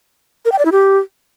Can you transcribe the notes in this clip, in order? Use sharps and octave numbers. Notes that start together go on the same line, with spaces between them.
A#4
G5
D5
E4
G4